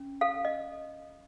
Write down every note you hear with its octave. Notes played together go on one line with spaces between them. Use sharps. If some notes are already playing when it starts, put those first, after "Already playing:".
Already playing: C#4
A4 F5
D#5